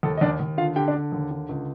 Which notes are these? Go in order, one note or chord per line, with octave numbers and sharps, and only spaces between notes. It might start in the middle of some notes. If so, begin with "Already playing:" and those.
D#2 A4
D#5
D#2 D4 D5
D#2
D3 F4 F5
D3 G4 G5
D4 D5
D3
D#2
D3
C#2